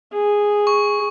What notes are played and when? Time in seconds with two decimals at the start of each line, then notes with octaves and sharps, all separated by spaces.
0.12 G#4
0.67 C#6